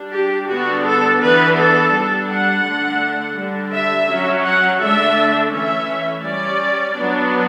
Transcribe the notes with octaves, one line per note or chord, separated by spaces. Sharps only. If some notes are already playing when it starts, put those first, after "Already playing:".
Already playing: G3 D4
G4
D3 G3 B3 D4 F#4
A4
E3 B3 D4 B4
A4
G3 D4
F#5
D3 A3 D4
D3 G3 D4
E5
F#3 C#4
F#5
D3 A3 D4 E5
E3 A3 C#4 E5
G3 C#4 D5
F#3 B3 D4